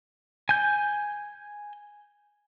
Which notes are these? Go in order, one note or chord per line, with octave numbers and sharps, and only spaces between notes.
G#5 G6